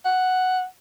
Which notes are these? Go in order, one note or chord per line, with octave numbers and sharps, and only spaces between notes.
F#5